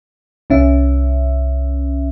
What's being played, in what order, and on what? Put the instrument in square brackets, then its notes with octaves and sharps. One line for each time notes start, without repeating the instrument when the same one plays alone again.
[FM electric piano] C2 C#4 E5